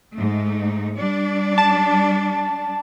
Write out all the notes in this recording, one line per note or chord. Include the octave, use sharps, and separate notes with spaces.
G#2 A3 D#4
G3 D4 D5
A5